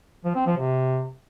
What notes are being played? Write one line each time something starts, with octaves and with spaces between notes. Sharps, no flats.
F3
C4
F3
C3